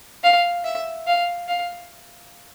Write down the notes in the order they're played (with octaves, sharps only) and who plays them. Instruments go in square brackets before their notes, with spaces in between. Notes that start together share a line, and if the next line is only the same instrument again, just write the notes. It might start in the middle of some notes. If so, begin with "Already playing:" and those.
[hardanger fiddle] F5
E5
F5
F5